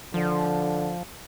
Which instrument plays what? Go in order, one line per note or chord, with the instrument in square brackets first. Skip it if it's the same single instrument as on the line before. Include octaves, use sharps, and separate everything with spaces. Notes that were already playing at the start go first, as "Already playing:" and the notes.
[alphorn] D3 [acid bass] F3